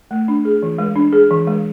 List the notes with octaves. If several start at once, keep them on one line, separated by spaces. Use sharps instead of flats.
A3
D4
G#4
E3
G#3
D4
G#4
E3
G#3